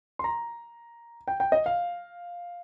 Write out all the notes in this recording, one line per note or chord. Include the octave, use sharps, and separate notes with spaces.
C6
A#5
G5
G5
D#5
F5